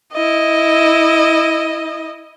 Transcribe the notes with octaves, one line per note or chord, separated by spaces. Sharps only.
E4 D#5